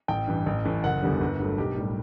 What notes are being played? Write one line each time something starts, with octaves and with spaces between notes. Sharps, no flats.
A1 G5
G2 E3
A1
A2 E3 A3
F#1 F#5
E2 D3 G3
G1
G2 F#3 A3
B1 G4
A2 G3